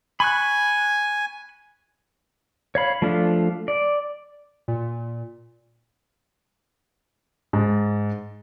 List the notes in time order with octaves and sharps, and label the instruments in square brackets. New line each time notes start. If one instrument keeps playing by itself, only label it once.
[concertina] G#5 [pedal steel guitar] B5 C#6 F#6
[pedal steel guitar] C#5 F5 B5
F3 A3 D4 F4
D5
[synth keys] A#2
[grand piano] G#2